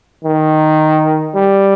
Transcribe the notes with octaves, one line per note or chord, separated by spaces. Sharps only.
D#3
G3